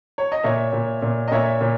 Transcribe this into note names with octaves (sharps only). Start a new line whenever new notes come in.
C#5
D#5
A#2 C#5 E5
A#2
A#2
D#5
A#2 C#5 E5
A#2